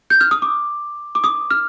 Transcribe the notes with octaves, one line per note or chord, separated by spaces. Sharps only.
G6
F6
D#6
D6
D6
D#6
F6